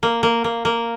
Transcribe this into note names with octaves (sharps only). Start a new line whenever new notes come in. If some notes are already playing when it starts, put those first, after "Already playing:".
A#3
A#3
A#3
A#3